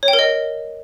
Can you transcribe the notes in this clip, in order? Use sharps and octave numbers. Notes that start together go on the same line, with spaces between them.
C#5
G5
A#4
D#5